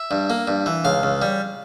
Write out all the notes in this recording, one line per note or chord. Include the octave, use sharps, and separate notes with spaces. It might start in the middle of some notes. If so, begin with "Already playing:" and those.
Already playing: E5
G2
A#3
G2
E3
C#2 F5
C#2
G3